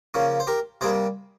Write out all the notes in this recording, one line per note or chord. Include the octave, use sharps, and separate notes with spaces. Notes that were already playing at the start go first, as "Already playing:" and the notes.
C#3 F3 A#3 C#4
C5
G4 A#4
C3 G3 A#3 G#4 C5